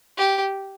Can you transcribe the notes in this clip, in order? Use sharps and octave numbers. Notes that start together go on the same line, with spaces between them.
G4